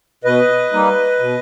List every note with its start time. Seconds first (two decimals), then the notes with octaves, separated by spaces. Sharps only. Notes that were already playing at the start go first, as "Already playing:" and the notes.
0.24 B2 B4 D#5
0.73 G3 A#3 D#4
1.19 B2